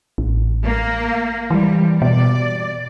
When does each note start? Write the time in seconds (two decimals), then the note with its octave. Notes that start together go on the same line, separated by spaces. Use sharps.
0.18 A1
0.65 A#3
1.51 E3 G3
2.02 B2 D5